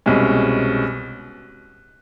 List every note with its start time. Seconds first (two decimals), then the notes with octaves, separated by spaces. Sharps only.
0.06 C2 B2 G#3 C#4